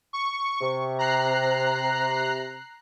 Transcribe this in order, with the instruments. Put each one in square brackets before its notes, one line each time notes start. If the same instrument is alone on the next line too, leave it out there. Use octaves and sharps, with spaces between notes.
[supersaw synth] C#6
[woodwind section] C3
[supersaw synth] A#5 F#6 C7